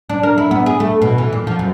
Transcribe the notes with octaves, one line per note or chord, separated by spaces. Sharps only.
D4
A#4
E4
B3
G#4
A3
B2
E3
A#2
F3
F#2